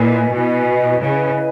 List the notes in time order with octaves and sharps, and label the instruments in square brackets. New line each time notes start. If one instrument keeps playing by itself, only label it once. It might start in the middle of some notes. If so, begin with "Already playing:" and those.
Already playing: [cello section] A#2 [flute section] E4 B4 D#5 G#5
[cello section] B2 [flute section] E4 B4 D#5 G#5
[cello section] C#3 [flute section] E4 B4 D#5 G#5